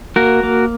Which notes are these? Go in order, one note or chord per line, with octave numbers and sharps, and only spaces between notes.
A#3 F#4 A#4
A#3